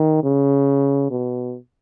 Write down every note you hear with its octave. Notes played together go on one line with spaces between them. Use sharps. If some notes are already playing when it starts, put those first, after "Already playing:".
Already playing: D#3
C#3
B2